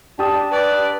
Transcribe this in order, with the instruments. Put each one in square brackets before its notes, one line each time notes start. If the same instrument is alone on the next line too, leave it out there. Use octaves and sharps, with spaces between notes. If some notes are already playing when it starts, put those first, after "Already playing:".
[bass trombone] D4 [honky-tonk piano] G4 D#6 [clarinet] A5
[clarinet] B4 [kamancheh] D5